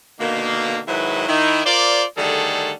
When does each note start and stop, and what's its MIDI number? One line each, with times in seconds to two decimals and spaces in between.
0.20 0.80 47
0.20 0.80 50
0.20 0.80 51
0.20 0.80 58
0.88 1.28 44
0.88 1.28 51
0.88 1.28 54
0.88 1.28 64
0.88 1.28 71
1.28 1.61 51
1.28 1.61 64
1.66 2.04 65
1.66 2.04 70
1.66 2.04 72
1.66 2.04 74
2.18 2.73 50
2.18 2.73 51
2.18 2.73 55
2.18 2.73 57
2.18 2.73 68
2.18 2.73 69